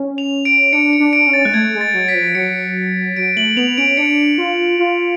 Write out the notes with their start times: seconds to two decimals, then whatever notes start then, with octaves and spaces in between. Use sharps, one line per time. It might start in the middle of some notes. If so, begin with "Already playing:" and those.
Already playing: C#4
0.18 F7
0.45 D7
0.73 D4 C#7
0.93 C#7
1.00 D4
1.13 D7
1.27 C#4
1.33 A6
1.45 G#3 F#6
1.54 A3 G#6
1.75 G#3
1.81 A6
1.94 F#3
2.08 B6
2.14 F3
2.35 F#3 C#7
3.16 F#3 D7
3.37 A3 F#7
3.57 B3 F7
3.78 C#4 D7
3.97 D4 C#7
4.38 F4
4.79 F4